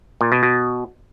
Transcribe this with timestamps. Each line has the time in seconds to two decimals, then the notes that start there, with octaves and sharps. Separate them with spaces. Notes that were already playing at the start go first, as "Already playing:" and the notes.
0.21 A#2
0.32 B2
0.43 B2